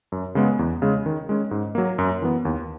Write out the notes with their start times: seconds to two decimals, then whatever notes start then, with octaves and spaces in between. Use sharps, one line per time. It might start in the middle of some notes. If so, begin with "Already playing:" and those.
0.12 F#2
0.35 C#3 G#3 B3
0.59 E2
0.82 C#3 G#3
1.06 D#3
1.29 G#3 C#4
1.51 G#2
1.75 F#3 A#3
1.98 F#2
2.22 E3 B3
2.45 D#2